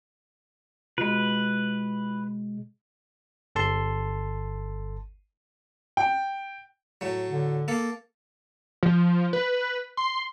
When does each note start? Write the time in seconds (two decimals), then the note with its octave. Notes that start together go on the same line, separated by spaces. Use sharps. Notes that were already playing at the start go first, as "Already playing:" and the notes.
0.98 B2 G#3 F4 B4
3.55 G1 A4 A5 C6
5.97 G5
7.01 A2 F#3
7.30 D3
7.68 A#3 A4
8.83 F3
9.33 B4
9.97 C6